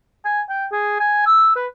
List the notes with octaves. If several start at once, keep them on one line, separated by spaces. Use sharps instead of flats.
G#5
G5
G#4
G#5
E6
B4